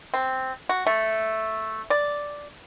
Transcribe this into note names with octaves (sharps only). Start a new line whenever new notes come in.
C4
F#4
A3
D5